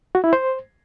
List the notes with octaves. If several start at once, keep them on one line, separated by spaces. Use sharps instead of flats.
F#4
E4
C5